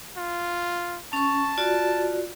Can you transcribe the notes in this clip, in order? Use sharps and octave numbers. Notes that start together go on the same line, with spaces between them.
F4
C#4 A5 C#6
F4 F#4 D5